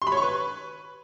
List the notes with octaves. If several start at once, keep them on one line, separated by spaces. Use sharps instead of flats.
C6
B5
C#5
C#6
B4